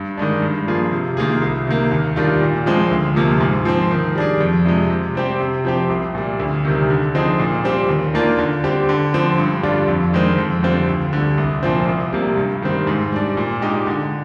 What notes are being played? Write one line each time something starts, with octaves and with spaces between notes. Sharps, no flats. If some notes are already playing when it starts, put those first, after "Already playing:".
Already playing: G2
D#3 G#3 D4
G2
F3 A#3 F4 G#4
C3
D#3 A#3 F4 G#4
C2
C3 D#3 A#3
D#2
D#3 G3 D4 F4
A#2
F3 G#3 C4
D2
C3 F3 A#3
G#2
F3 C4
D#3
G3 D4 G#4
F2
C3 F3 G#3
C3
G3 C4 G4
C3
F3 C4 G4
C2
A#2 G3
D2
C3 D#3 G3
D3
F3 C4 D#4 G#4
A#2
G3 C4 G4
D#2
D#3 A#3 D4 F4
D3
G3 C4 G4
D3
F3 C4
G2
D3 G3 D4 F4
F2
D#3 G#3 C4
F2
D3 G3 C4 F4
D2
D3 G3
C2
A#2 F3 C4
C2
C3 G3 A#3
G2
D#3 G3 C4
G#2
G3 D4
A#2
G#3 D#4 G4
D3